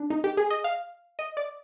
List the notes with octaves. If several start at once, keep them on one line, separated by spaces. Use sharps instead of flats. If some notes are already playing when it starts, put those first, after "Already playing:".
Already playing: D4
D#4
G4
G#4
D#5
F5
D#5
D5